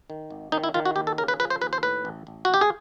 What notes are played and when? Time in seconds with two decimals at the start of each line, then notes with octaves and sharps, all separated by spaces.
0.10 D#3
0.30 G#1
0.52 D#3 D#4
0.64 E4
0.74 D#3 F4
0.85 F#4
0.96 D#2 G4
1.07 A4
1.18 C#3 A#4
1.28 B4
1.40 F3 B4
1.50 C5
1.61 D#2 B4
1.73 C5
1.83 A2 B4
2.05 A1
2.27 A1
2.45 A1 F#4
2.54 G4
2.61 G#4